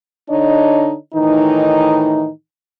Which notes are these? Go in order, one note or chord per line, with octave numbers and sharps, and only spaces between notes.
D3 D4 D#4 C#5 D#5
A2 D#3 E3 D#4